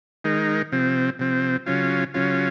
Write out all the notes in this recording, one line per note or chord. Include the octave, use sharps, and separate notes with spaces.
D#3 G#3 D#4 A#4
C3 F3 C4
C3 F3 C4
C#3 F#3 C#4 F4
C#3 F#3 C#4 F4